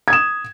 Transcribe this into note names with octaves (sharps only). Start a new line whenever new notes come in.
D#6 G#6 E7